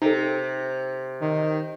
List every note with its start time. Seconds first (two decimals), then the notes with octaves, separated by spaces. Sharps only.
0.02 C3 D#4 A4
1.21 D#3